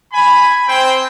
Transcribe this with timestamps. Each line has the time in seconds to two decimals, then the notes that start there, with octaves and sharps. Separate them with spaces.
0.13 G#5 B5
0.68 C4 C5 G5